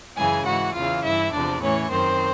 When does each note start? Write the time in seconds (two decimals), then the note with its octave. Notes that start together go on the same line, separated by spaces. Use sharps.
0.16 F#2 C#3 E3 G#4 G#5
0.45 G#2 E3 F#4 F#5
0.74 E2 C#3 E3 F4 F5
1.03 G2 E3 E4 E5
1.32 E2 C3 F3 D4 D5
1.61 A2 E3 C#4 C#5
1.90 F#2 D#3 C4 C5